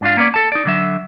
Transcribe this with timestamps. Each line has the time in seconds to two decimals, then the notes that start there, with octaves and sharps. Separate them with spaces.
0.01 G#2 D4 F4 F5
0.17 A#3 B3 C#4 D5
0.34 A4 A5
0.52 D#4 D5
0.65 D3 F#3 E5